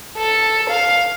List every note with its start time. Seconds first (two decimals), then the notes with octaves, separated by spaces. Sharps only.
0.18 A4
0.70 F5